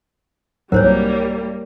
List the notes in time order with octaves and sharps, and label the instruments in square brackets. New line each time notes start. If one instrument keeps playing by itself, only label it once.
[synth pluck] C2 G#2 F#3 [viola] G3 A#3 [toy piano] A#4 C5 C#5